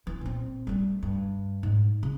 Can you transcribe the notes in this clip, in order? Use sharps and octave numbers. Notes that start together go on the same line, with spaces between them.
E3
A#2 C4
G3 A3
G2
G#2
C#3